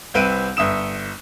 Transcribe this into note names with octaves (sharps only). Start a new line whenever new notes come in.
C2 C4 B4 E5 D7 D#7
G1 E5 D#6 E7